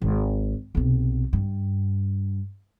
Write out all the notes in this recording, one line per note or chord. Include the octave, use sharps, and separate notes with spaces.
G#1
B1 C3
G2